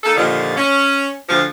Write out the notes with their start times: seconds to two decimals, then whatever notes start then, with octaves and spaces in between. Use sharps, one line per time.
0.04 A#3 D#4 A4
0.16 D#2 A#2 D3 D#3 F3
0.57 C#4
1.29 D2 F3